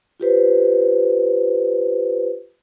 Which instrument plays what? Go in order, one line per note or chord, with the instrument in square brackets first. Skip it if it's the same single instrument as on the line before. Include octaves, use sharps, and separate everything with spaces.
[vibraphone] F4 G4 B4 C5